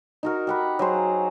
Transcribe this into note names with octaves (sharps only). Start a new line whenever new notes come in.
D#4 F#4 A#4
G4 F#5 B5
F#3 G#4 C5